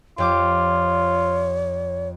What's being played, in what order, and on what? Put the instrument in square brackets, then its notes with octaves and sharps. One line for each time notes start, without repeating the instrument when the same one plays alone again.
[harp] F2 G4 D6 [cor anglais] F4 [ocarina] C#5